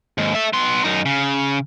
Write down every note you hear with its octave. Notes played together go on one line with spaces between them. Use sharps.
D#2 G#2
A4 E5
B3 C6
F#2 D#4
C#3